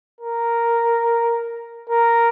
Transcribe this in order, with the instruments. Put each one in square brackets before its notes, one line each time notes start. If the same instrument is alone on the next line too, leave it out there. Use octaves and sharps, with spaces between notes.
[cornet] A#4
A#4